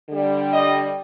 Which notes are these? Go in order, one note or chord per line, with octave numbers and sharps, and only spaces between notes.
D3 G3
D#5